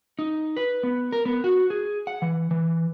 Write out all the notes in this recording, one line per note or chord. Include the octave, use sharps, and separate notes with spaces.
D#4
B4
B3
A#4
B3
F#4
G#4
F#5
E3
E3